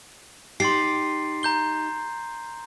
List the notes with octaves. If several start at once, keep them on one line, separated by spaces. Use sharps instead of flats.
D#4 G4 C6 A6 C7
A#5 G6 G7